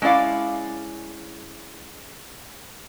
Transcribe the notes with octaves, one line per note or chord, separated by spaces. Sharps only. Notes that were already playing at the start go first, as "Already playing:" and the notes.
G#3 C#4 E4 D5 F5